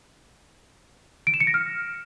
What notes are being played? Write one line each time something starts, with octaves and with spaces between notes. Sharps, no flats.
D7
E7
C#7
A#6
F6